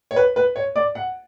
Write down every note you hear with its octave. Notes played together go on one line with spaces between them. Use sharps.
C#5
B4
B4
C#5
D5
F#5